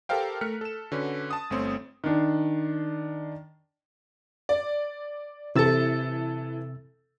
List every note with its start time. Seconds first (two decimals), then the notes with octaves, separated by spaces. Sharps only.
0.09 G4 A4 A#4 C5 F5 G5
0.41 A3 A#4 F6 F#6 B6 C#7
0.61 A4 E7
0.92 D3 C#4 F#4 B4
1.31 A5 D#6
1.50 G1 A3 C4 C#5 C6
2.04 D#3 D4
4.49 D5
5.55 C3 E3 A4 E6 A6